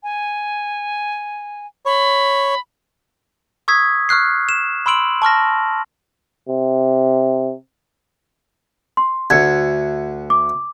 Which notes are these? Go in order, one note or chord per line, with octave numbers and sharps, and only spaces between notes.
G#5
C#5 B5
C#6 D#6 E6 G#6 B6
C#6 F6 F#6 C7
E7
B5 C6 E6 D7 F#7
A5 C#6 F6 A#6
C3
C6
D2 G#6 C#7
D6